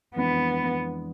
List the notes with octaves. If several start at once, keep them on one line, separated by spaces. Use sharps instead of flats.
F2 E3 G#3 B3 D4